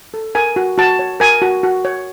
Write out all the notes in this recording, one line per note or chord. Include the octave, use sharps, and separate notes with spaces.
A4
A#4 G#5
F#4
F#4 A5
C#5
A#4 G#5
F#4
F#4
C#5